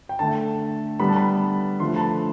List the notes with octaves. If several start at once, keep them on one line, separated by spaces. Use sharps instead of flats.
G5
D3 A3 A5
D3 G3 B3 B5
A5
B5
D3 F3 A3 C6
A5
B5